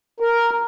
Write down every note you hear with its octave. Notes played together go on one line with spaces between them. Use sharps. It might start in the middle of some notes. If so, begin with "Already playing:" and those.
A#4